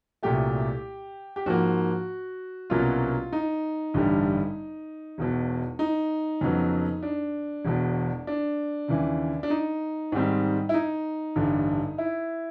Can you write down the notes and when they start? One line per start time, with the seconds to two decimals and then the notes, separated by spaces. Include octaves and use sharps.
0.23 C2 A#2 F#3 A3 G4
1.36 G4
1.46 G#2 F3 A#3 F#4
2.70 C2 B2 F#3 A#3 C#4 F4
3.33 D#4
3.94 A1 G2 D3 G3
5.18 E1 E2 B2
5.79 D#4
6.41 F2 C#3 F#3 B3
7.03 D4
7.65 E1 E2 B2
8.27 D4
8.88 D#2 C#3 E3
9.43 D4
9.50 D#4
10.12 G#2 D#3 G3 C4
10.69 E4
10.74 D#4
11.36 A1 G2 D3
11.98 E4